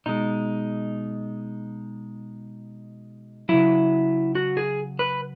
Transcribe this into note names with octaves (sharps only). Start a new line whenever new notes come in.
B2 G#3 D#4
C#3 F#3 E4
F#4
G#4
B4